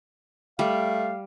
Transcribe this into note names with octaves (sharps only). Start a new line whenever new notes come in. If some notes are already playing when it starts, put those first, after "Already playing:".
G3 A3 F5